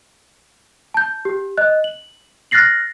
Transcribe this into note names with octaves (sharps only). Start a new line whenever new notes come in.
A5 G6
G4
D#5 F#6
F#7
F6 F#6 A6 A#6 C7 F#7